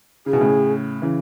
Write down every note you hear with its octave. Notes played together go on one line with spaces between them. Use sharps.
C#3 G#4
B2
A2 C#3
C#3 E3